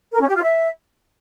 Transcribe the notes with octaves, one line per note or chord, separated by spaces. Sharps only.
A#4
C#4
G4
F4
E5